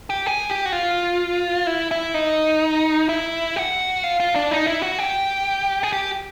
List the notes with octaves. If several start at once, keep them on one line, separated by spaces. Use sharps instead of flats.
G4
G#4
G4
F#4
F4
E4
E4
D#4
E4
F#4
F4
F4
D4
D#4
E4
F#4
G4
G#4
G4